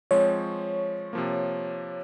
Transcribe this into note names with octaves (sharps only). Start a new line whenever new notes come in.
F3 G#3 C4 C#5
C3 F3 A#3